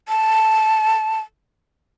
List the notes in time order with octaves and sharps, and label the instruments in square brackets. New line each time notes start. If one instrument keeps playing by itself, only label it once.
[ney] A5